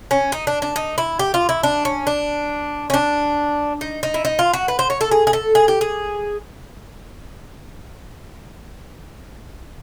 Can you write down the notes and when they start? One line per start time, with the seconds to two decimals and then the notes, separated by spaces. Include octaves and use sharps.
0.11 C#4
0.32 D#4
0.47 D4
0.62 D4
0.76 D#4
0.98 E4
1.19 G4
1.34 F4
1.49 E4
1.63 D4
1.85 C#4
2.07 D4
2.90 C#4
2.94 D4
3.81 D#4
4.03 D#4
4.14 E4
4.25 D#4
4.39 F4
4.53 F#4
4.68 B4
4.79 C5
4.90 C#5
5.01 A4
5.11 G#4
5.27 G#4
5.33 A4
5.55 G#4
5.68 G4
5.81 G#4